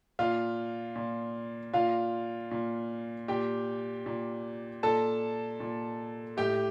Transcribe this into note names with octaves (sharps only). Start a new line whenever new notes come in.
A#2 F4 F5
A#2
A#2 F4 F5
A#2
A#2 G4 G5
A#2
A#2 A4 A5
A#2
A2 G4 G5